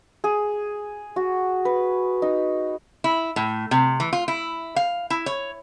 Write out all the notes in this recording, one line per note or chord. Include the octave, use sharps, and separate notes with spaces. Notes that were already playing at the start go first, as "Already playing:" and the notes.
G#4
F#4
B4
D#4
E4
A2
C3
E3
F4
E4
F5
E4
C#5